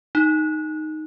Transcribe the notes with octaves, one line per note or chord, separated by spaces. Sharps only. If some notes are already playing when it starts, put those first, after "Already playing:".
D#4